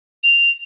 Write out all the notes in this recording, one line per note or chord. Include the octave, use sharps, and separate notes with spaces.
F7